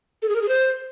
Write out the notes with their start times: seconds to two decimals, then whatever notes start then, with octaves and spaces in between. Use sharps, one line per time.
0.22 A4
0.29 G#4
0.35 A#4
0.42 G#4
0.49 C5